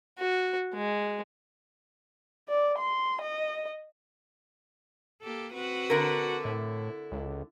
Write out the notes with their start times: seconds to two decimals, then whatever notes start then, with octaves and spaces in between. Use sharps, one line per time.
0.19 F#4
0.75 G#3
2.48 D5
2.78 C6
3.21 D#5
5.22 A#3 G4 A4
5.53 C4 F#4 B4
5.90 D3 A#4
6.45 A2 E4
7.12 C#2